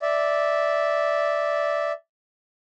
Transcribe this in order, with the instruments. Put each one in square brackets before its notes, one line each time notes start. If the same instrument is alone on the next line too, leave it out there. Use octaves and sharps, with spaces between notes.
[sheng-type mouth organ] D5 E5